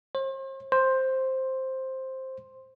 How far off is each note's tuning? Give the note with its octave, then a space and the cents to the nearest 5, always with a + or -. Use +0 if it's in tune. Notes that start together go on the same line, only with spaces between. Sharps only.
C5 +40
C5 +5